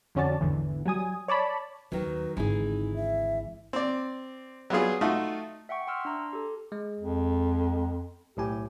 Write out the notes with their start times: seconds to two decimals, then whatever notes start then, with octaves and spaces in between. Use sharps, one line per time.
0.15 F2 D3 C#4 F#4 D5 A5
0.40 G#1 E2 D3 E3
0.85 F#3 G3 G#5 D#6
1.28 C#5 D5 A5 B5
1.92 D#2 D#3 F#3 B4
2.37 G#1 D3 E3 D#4 G#4
2.96 E5
3.73 C4 D5
4.70 F#3 G3 B3 F4 G#4
5.01 A3 D#4 F4 F#4
5.69 E5 F#5 G5 C#6
5.87 G5 C6 E6 F6
6.05 D4 A#5 C6
6.33 G4 A4
6.72 G#3
6.99 F2
8.37 B1 A2 G4 G#5